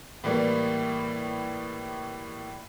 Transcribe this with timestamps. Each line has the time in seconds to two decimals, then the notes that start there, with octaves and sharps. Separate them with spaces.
0.24 A2 E3 G3 A#3